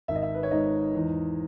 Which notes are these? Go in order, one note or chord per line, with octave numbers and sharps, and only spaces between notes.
G#1 E5
D#5
E5
B4
C#5
G#2 D#5
E2